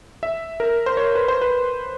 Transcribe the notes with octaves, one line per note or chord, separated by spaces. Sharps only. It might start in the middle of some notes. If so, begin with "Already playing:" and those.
E5
A#4
C5
C#5
B4
C5
B4